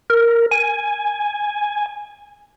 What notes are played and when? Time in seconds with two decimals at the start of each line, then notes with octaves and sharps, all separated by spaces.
0.10 A#4
0.51 G#5